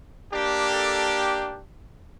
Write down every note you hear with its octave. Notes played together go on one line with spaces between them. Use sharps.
A#3 D4 G4
A4